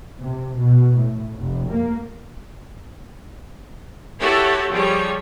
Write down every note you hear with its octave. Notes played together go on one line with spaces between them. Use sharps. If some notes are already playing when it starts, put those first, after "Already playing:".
C3
B2
A2
F1
A#3
E4 F#4 G4 A4 C#5
F3 G3 G#4 C#5